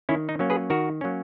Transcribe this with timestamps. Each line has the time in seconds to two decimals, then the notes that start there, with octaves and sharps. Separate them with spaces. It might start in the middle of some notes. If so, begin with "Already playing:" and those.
0.09 D#3 C#4 E4
0.29 D#4
0.39 F#3 A#3 C#4
0.50 G#4 B4
0.70 D#3 F#4 A#4
1.01 F#3 A#3 C#4